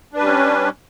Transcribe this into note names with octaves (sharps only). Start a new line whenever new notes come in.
G3 C#4 D4 B4